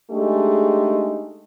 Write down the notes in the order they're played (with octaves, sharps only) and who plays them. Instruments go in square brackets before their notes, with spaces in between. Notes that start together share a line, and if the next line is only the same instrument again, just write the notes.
[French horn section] G#3 A3 D4 D#4 G4 G#4